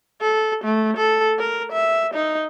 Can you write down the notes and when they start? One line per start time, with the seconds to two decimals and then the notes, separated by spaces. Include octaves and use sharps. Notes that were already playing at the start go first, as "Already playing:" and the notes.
0.21 A4
0.64 A3
0.97 A4
1.39 A#4
1.72 E5
2.15 D#4